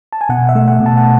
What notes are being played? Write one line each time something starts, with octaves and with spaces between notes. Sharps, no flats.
A5
G#5
B2 F#5
E5
A3
F#5
B2
A5
F#5